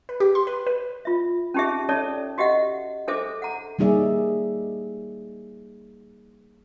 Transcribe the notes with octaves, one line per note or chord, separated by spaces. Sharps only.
B4
G4
C6
B4
B4
F4 E5
C#4 D#4 G4 G#4 E5
C#4 A4 C#5 D5 E5 A5
F#4 G4 D#5 E5 F#5
D4 G#4 A4 C5 E5 D6
F#5 A#5
G3 A#3 D#4 G#4 D5 E5